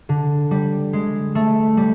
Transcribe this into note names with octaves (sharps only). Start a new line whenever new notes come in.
D3
G3
G#3
A3
G3